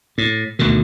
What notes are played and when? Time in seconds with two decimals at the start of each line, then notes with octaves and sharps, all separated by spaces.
0.18 A2
0.59 D2 B2 D3 D#3